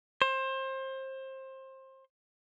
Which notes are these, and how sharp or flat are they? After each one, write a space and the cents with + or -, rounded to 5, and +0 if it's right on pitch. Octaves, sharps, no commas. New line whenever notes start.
C5 +25